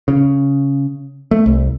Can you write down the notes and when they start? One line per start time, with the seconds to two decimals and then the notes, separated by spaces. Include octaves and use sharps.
0.08 C#3
1.31 A3
1.46 C2